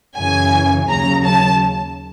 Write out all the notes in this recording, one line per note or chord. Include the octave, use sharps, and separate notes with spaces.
F#2 C#3 E3 G#5
D#2 C#3 F#3 A#5
A5